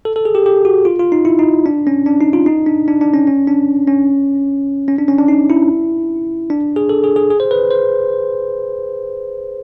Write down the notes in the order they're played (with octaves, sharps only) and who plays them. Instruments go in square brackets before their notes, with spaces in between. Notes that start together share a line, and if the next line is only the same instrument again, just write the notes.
[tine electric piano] A4
A4
G#4
G4
G4
F#4
F4
F4
D#4
E4
D#4
D4
C#4
D4
D#4
F4
D#4
D4
D4
D4
C#4
C#4
D4
C#4
C#4
D4
C#4
D4
D#4
E4
D4
G#4
A4
G#4
G#4
G#4
C5
B4
C5